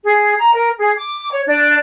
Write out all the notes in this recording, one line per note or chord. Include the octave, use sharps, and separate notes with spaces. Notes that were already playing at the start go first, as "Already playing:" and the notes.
G#4
A#5
A#4
G#4
D6
C#5
D4